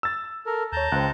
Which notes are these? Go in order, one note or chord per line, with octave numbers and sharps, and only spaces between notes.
E6 A6
A4 A#4
D#2 C#5 A5 A#5 G6
C#2 C5 G5 F#6